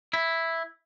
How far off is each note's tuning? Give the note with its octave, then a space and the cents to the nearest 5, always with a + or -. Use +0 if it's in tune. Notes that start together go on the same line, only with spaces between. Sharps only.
E4 +0